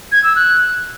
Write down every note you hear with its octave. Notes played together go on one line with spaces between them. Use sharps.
G#6
E6
F#6